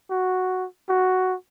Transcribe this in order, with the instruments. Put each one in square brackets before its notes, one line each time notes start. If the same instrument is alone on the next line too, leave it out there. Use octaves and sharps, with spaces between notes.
[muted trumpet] F#4
F#4